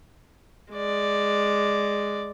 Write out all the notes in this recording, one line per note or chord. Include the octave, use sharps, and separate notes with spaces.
G#3 D5